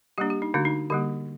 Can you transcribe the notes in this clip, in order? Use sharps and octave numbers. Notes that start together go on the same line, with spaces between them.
G3 A#3 D4 G4
G4
D#4
D3 A3 D4 F#4
D#4
D3 G3 A#3 G4